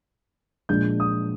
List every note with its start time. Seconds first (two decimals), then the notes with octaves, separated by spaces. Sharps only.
0.69 A#2 F3 G#3 D4 G6
1.00 D#6